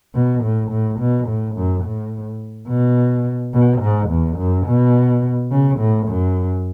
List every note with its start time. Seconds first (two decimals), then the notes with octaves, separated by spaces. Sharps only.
0.15 B2
0.43 A2
0.71 A2
1.00 B2
1.28 A2
1.56 F#2
1.84 A2
2.68 B2
3.54 B2
3.81 G#2
4.09 E2
4.37 F#2
4.67 B2
5.51 C#3
5.79 A2
6.08 F#2